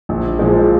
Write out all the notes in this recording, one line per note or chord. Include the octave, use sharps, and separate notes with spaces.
A#1
A#2 F3 G#3